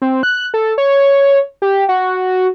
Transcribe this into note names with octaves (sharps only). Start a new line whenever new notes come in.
C4
F#6
A4
C#5
G4
F#4